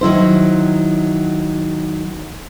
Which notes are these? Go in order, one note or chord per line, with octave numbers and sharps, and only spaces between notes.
D#3 F#3 E4 C5